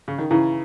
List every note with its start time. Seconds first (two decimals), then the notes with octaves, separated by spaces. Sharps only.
0.08 C#3
0.18 D#3
0.30 C#3 E3 E4